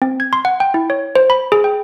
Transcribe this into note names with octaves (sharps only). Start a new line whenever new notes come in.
C4
G#6
C6
F#5
G5
E4
C#5
C5
B5
G#4
G5